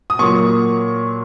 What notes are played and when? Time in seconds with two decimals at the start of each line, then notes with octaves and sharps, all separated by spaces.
0.10 D#6
0.19 A#2 F#3 A#3 C#6